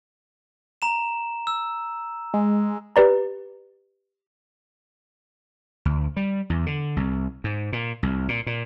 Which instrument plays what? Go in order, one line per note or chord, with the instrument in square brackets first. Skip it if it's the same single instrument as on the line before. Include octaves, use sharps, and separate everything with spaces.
[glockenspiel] A#5 E7
E6
[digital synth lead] G#3
[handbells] G4 B4 D5 A#5
[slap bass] D2
G3
E2
D3
C2
G#2
A#2
C2
A#2
A#2